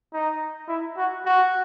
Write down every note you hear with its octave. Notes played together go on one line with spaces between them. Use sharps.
D#4
E4
F#4
F#4